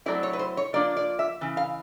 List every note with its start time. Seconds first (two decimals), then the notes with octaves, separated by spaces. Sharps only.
0.06 F#3 A3 C4 E4 D5
0.23 C#5
0.33 B4
0.39 C5
0.57 C#5
0.73 F3 A#3 D4 F4 D5
0.97 D5
1.19 E5
1.41 C#3 E3
1.57 F5